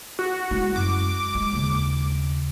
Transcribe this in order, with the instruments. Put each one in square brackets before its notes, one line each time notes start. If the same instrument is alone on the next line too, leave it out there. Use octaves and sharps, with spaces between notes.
[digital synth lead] F#4
[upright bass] G#3 E4
[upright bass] F#2 [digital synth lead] D6
[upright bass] G#3
D#2 C#3